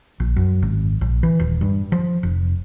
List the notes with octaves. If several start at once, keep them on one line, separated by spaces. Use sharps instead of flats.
A#1
F#2
G#1
A#1
E3
D#1
G2
F3
F1